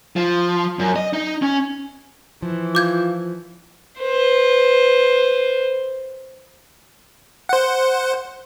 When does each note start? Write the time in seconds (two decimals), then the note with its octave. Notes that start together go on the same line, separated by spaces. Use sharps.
0.16 F3
0.79 F#2
0.96 D#5
1.13 D#4
1.42 C#4
2.43 E3 F3
2.75 F4 D6 G6 G#6
4.00 B4 C5
7.49 C5 F#5